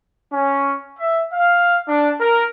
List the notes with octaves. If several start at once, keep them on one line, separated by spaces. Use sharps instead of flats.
C#4
E5
F5
D4
A#4